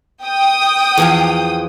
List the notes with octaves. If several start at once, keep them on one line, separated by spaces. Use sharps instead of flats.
G5 D#6
E2 F3 F5